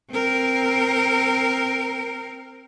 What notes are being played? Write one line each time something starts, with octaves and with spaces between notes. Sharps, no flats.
C4 A#4